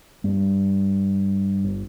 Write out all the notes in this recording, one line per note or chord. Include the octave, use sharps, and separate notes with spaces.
G2
G1